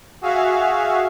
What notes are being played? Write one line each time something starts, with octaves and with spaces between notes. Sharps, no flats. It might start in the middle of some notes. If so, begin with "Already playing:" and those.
F#4 G#4 E5 F5